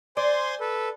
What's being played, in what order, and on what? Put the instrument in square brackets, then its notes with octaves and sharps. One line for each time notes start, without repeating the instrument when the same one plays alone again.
[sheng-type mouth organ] C5 G#5 C6 [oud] D5
[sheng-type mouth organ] A4 B4